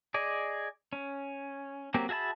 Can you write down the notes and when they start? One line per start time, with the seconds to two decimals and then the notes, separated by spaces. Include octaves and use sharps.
0.14 G#4 D5 D#5
0.93 C#4
1.94 F#3 A#3 C4 G4
2.09 F#4 G#4 E5 A5 B5